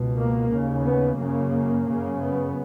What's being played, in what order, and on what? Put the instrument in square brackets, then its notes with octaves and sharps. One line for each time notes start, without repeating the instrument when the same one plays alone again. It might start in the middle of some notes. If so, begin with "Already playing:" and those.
Already playing: [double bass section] C#2 B2
A#3
D#2 C#3
B3
F#2 C#3 A#3
F#2 C#3
B3